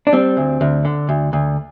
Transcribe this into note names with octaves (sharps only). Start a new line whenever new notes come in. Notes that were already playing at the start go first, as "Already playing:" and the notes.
D4
G3 C4
D2
D2
D3
D2
D2